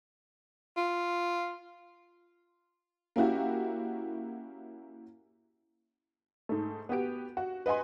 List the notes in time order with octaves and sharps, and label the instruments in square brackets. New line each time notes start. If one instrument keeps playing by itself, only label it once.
[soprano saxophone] F4
[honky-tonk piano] A#3 C#4 E4 F#4 G4
G#2 A3
B3 F#4 G4 D7
F#4
B4 D#5 F#5 G#5 C6